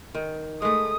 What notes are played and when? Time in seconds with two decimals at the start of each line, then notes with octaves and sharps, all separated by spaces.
0.15 D#3
0.62 G#3 A3 D#6